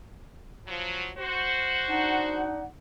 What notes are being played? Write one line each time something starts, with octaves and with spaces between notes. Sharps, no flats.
F3 F#3
F#4 C5
D4 D#4 F#5